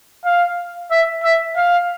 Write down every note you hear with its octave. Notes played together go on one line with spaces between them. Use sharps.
F5
E5
E5
F5